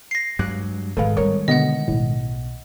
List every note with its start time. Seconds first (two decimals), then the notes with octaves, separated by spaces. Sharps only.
0.11 A#6 C7
0.39 G2 F#3 G#3 D6 F#6
0.97 G#2 D#3 G#3 A3 A4 B4 F5
1.17 G3 C4 A#4 C#5 C#6
1.48 B2 D3 B3 D#5 F#5
1.88 B1 A2